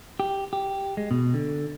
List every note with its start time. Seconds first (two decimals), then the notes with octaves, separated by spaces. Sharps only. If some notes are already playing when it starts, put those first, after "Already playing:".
0.20 G4
0.53 G4
0.97 G#3
1.11 B2
1.34 D3